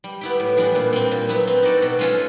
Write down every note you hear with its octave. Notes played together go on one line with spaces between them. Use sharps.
G3
B3 E4 G4
A2
E3 G3 B3 D4
A#2
G3 C4
A#2
F#3 B3 E4
C4
D#4 F#4 A4 D5
B2
G#3 C#4 F4 A4